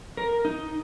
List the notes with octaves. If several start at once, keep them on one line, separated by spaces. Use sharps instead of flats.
A#4
D#4